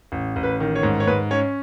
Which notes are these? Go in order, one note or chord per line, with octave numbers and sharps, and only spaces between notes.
A1
A1
B4
D#3
C#5
G#2
C#5
G#2 B4
C#4 C#5